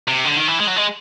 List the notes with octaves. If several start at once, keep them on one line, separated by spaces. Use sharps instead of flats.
C3
D3
D#3
E3
G#3
F#3
G#3